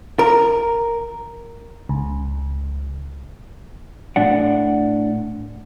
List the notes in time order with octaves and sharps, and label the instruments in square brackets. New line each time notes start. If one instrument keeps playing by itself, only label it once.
[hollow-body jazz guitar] A#4
[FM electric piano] C#2
[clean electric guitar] A2 D4 D5 F#5